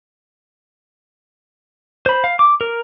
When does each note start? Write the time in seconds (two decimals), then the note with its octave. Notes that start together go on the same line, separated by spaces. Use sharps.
2.06 C5 B5
2.24 F5
2.39 D6
2.61 A#4